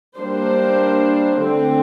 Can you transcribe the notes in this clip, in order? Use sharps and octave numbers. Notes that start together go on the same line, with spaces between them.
G3 A#3 D4 C5
D3 A3 C4